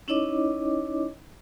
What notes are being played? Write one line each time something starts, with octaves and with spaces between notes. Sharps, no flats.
C#4 D#4 E4 C#5 D#5 D6